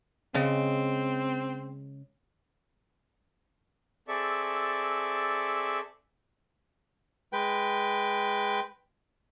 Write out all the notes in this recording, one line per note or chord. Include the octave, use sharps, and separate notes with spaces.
C#3 G#3 C4
C4 G#4 A4 D5 E5 C#6
G#3 B4 G5